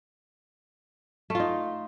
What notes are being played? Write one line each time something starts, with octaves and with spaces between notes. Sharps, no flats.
A3 D#4 F4